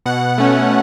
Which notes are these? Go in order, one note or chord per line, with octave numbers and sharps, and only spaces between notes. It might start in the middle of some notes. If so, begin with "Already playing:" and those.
B2 F#5
A3 C#4